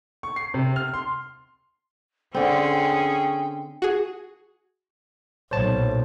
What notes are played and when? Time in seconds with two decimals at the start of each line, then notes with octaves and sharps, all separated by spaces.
0.23 C#6
0.36 C7
0.54 C3
0.76 F6
0.94 C6
2.34 D3 C4 C#4 G#4 G5
3.82 F#4 G#4
5.51 B1 A#2 C5 C#5 A5